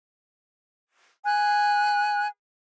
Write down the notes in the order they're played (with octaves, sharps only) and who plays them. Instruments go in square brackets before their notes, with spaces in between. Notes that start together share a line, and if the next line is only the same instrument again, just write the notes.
[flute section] G#5 F#6